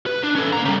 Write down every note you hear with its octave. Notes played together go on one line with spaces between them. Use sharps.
B4
D4
C#4 A4
A#3 A#5
C#3 G3